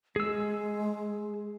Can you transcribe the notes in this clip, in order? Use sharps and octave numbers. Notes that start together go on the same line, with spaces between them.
G#3 G#4 E6